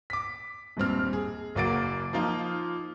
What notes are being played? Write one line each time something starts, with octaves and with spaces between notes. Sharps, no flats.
D6 B6
D#1 G2 C4 F6
G#4
F#1 F#3 A#3 A6 D7
F3 A#3 D#4 F4